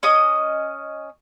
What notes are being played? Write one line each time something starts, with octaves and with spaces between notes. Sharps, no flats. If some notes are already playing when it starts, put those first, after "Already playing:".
C#4 D#5 D#6